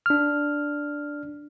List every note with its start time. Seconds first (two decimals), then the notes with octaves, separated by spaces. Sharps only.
0.06 D4 F6